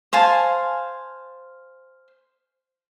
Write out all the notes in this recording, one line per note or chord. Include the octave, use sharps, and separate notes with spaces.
C5 F5 G#5 A5